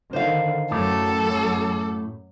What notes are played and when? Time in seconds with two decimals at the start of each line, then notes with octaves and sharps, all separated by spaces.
0.13 D3 D#3 C5 F5
0.71 F#2 A2 F#3 A3 G4 A4